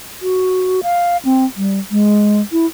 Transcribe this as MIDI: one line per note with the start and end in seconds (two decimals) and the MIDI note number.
0.22 0.80 66
0.83 1.17 77
1.25 1.45 60
1.56 1.79 55
1.91 2.41 56
2.52 2.66 64